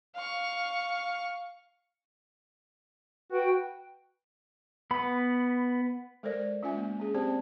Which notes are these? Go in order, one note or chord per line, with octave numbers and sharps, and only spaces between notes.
F5 C#6
F#4 B4 G5
B3 B5
G#3 A4 A#4 C5 D5
G#3 C#4 F4 E5 G#5
A#3
C#4 G#4
C4 G4 C5 D5 A5